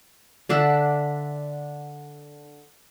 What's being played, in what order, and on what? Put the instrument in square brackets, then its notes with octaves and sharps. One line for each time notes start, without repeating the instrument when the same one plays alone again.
[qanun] D3 D4 E5 F#5